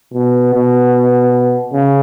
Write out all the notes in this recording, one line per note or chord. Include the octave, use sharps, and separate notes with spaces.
B2
B2
C#3